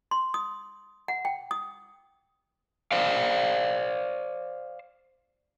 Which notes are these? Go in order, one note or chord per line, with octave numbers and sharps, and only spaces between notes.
C6
D#6
F#5
G5
D#6
C5 D5 F5